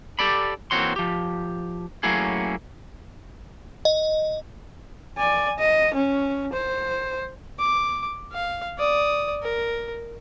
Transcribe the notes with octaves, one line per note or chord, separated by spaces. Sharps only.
G4 A4 D5 B5
E3 A#3 C4 F#4 C#5 C6
F3 G4
F#3 A3 A#3 C#4 E4 G#4
D#5
D5 G#5
D#5
C#4
C5
D6
F5
D5 D#6
A#4